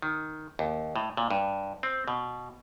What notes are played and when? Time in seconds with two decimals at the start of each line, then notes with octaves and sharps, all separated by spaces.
0.02 D#3
0.59 D#2
0.96 A2
1.17 A#2
1.31 G2
1.83 C4
2.08 B2